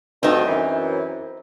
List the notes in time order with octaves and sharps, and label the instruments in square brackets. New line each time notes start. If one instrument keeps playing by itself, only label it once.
[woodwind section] D2 G2 [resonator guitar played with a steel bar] C4 D#4
[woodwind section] F#2 E3